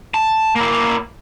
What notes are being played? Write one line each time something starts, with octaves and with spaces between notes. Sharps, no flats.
A5
A#3 E4